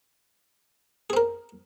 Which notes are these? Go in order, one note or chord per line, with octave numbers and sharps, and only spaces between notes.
C4 G#4 A#4